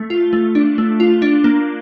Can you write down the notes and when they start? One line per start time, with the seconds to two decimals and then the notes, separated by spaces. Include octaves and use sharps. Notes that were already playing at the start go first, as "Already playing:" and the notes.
Already playing: A3
0.10 F4
0.33 A3
0.55 D4
0.78 A3
1.00 F4
1.22 D4
1.44 A#3